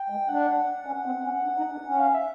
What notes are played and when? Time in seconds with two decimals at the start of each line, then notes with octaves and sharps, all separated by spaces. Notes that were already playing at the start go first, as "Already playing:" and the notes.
Already playing: G5
0.10 G#3
0.29 D4 F#5
0.86 C#4
1.05 C4
1.24 C#4
1.43 D4
1.57 D#4
1.71 D4
1.86 C#4
1.99 F5
2.14 E5